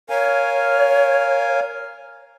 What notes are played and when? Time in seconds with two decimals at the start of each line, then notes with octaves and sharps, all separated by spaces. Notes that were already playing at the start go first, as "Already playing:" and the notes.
0.10 A#4 C#5 F5 G#5